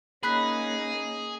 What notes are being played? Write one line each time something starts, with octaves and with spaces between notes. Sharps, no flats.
A#3 C#4 D#4 G#4 B5 F#6 B6